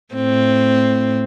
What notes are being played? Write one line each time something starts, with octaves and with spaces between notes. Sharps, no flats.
A2 C4